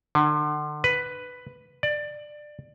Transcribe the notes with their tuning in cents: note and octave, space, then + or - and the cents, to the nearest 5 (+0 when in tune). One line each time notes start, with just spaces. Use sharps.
D3 +35
B4 +5
D5 +20